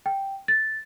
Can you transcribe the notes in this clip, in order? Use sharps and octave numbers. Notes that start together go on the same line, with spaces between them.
G5
A6